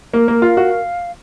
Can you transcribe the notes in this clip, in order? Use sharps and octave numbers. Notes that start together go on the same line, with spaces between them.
A#3 A#4
A#3
F4 F5
F#4